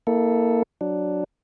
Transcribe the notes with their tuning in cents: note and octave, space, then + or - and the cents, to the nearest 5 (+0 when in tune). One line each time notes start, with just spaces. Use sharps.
A#3 +0 E4 -35 A4 +0
F#3 +0 D4 +0